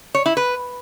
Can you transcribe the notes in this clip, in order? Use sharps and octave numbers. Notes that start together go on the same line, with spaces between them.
C#5
E4
B4